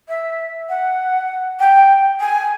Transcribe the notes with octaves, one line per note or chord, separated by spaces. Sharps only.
E5
F#5
G5
G#5